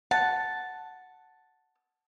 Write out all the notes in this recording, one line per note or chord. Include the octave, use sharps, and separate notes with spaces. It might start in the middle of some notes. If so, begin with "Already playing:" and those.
F#5 A5